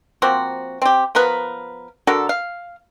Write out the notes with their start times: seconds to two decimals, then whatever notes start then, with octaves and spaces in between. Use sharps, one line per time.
0.22 F3 A#3 C4 F#4
0.82 C4 G4
1.15 F3 B3 A#4 B4
2.07 D3 F#4 A4 A#4
2.29 F5